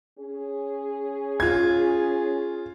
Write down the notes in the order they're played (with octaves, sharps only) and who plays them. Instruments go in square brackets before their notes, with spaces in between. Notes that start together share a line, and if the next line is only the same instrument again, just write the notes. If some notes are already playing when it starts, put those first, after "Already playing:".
[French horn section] C#4 G#4
[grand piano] F4 G#6